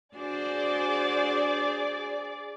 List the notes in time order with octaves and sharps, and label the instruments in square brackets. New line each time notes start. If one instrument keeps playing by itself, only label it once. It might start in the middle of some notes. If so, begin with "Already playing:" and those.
[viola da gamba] D4 F#4 C5 [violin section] G#4 D5